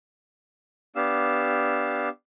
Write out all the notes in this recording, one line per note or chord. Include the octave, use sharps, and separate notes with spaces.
B3 D4 G4 F5 E6